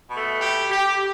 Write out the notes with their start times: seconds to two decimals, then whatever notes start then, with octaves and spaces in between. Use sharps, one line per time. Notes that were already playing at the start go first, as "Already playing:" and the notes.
0.11 B2 A3
0.40 G4
0.70 G4